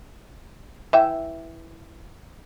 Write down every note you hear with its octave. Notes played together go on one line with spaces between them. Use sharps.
E3 E5 G5